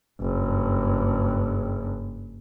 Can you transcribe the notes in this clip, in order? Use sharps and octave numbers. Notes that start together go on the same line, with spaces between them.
F#1 G2